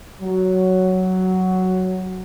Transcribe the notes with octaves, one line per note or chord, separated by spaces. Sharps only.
F#3